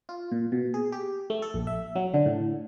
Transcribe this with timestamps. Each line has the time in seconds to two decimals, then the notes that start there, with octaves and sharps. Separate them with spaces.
0.09 F4
0.32 A#2
0.52 B2
0.74 G#4
0.92 G4
1.30 A3
1.42 A4
1.54 A#1
1.67 E5
1.96 F#3
2.14 D3
2.26 A2